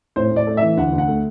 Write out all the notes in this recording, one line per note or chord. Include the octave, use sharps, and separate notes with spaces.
A2 C5
A2 D5
A3
E5
E3
D2 F#5
D2
F#5
A3